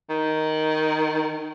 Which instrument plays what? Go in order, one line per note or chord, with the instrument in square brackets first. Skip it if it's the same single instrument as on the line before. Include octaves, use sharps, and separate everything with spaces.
[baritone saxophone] D#3